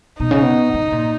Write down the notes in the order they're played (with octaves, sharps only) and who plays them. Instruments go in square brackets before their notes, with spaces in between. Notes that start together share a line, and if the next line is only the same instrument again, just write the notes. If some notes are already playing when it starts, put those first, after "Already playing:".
[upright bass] B2 [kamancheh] D#4
[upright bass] C#3
B2
C#3
A#2